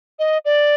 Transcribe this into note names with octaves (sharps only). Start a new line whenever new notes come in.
D#5
D5